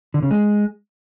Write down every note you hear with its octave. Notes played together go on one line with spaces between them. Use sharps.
D3
C#3
G#3